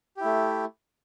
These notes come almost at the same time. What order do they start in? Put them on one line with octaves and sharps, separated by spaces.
G4 E4 A3